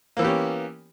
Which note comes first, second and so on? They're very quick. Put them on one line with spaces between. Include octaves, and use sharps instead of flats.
A#3 E3 B3 G4 C#4